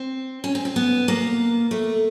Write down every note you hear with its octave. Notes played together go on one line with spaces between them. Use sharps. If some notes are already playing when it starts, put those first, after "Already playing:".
Already playing: C4
C#4
C4
C4
B3
A#3
A3